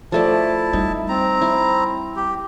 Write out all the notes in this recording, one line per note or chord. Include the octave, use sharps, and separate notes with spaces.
F3 A3 E4 D5 A5
G3 D#4
C4 A#5
E4
G4